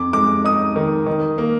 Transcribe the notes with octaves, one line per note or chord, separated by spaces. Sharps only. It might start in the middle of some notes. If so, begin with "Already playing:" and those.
Already playing: F2 D6
G#3 D6
D#4 D#6
D#3
D#3
A#3